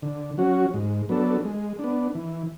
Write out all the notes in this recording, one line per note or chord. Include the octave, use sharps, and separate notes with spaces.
D3
F#3 C#4 F#4
G#2
F#3 B3 D4 A4
G#3
B3 D4
E3